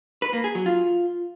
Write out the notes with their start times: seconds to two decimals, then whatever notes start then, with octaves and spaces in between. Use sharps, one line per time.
0.22 B4
0.33 A#3
0.44 G#4
0.55 F#3
0.66 F4